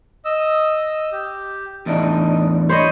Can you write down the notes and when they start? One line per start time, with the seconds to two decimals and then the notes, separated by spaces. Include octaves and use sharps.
0.25 D#5 E6
1.12 G4
1.86 E2 A2 D4 D#4
2.69 C5 C#5 D#5 B5 C#6